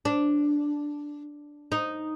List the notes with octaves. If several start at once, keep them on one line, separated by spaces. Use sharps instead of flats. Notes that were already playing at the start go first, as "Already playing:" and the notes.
D4
D#4